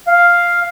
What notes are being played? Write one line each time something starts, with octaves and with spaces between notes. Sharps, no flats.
F5